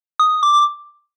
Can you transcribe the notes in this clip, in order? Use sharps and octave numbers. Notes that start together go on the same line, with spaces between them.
D#6
D6